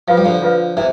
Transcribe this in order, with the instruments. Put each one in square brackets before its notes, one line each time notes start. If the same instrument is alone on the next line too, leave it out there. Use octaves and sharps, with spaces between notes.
[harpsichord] F3 [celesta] F4 B4 F5
[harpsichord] G3
D3 F3
[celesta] F4 B4 F5
[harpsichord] C3 E3